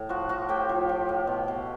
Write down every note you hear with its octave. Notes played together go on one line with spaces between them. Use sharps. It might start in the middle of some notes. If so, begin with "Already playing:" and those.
Already playing: A2
F3 F#4 F#5
F3 F#4 F#5
A2 G4 G5
F3
F3
A2
B2
B2